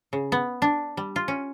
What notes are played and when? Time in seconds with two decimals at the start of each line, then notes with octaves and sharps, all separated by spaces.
0.13 C#3
0.32 B3
0.62 D4
0.97 G3
1.16 F4
1.28 C#4